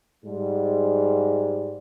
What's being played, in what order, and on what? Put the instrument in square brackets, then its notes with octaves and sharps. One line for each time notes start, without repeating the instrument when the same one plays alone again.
[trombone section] G#2 G3